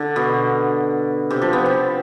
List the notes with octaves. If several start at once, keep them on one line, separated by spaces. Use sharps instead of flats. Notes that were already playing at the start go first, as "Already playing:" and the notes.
Already playing: D3
B2
C3
F3
B3
C4